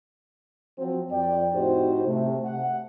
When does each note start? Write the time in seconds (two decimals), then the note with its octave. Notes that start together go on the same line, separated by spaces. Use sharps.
0.78 F3 F#3 C4
1.11 F2 D5 G5
1.54 A2 C4 D#4 F#4 G4 C5
2.06 C3 A3
2.45 F#5